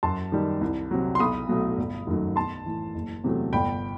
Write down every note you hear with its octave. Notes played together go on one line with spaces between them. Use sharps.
F#2 A5 C6
D#3 G3
C2
C3 F#3
C6
B1 B5 D#6
B2 F#3 A3
G1
F#2 D#3 F#3 A3
B1 A5 C6
A2 E3
F#1
E2 C3 F#3 A3
G1 G5 B5